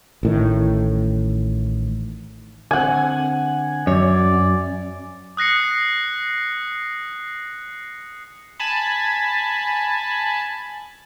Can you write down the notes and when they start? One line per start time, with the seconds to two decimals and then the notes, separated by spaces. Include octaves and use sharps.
0.23 A1 A2 D#3
2.71 D3 C4 F#5 G#5
3.87 F#2 C#5 D5
5.37 D#6 F#6 A#6 C7 C#7
8.60 G#5 A5 B5